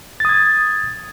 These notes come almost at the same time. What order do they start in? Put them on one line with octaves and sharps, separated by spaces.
A6 D#6 G#6